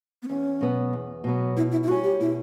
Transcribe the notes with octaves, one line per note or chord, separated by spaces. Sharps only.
B3
E2 C#4
B2 F#3 B3
E2
B2 F#3 B3
B2 E4
E4
E4
G3 C#4 F#4
G4
B2 E4